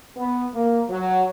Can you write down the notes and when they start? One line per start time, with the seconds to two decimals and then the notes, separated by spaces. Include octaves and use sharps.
0.17 B3
0.54 A#3
0.89 F#3